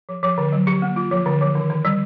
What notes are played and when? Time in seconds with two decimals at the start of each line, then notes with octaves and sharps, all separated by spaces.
0.09 F3
0.23 F3
0.38 D3
0.52 F#3
0.67 G4
0.82 A#3
0.96 F4
1.11 F3
1.26 D3
1.41 F3
1.55 D#3
1.70 D#3
1.85 G3